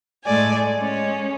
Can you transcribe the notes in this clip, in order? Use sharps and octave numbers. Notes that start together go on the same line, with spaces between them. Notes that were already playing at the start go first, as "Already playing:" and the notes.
A2 G#3 A3 D5 G#5
G#3 C#4